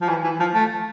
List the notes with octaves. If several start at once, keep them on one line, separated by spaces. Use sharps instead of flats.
F3
E3
E3
F3
A3